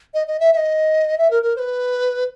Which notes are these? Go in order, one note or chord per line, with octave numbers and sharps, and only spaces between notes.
D#5
D#5
E5
E5
D#5
E5
A#4
A#4
C5
B4